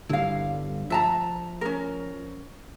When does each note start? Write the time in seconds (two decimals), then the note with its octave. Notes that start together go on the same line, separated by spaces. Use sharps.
0.09 G1 D3 G3 E4 F5
0.90 F3 E5 A5 A#5
1.61 C#4 A#4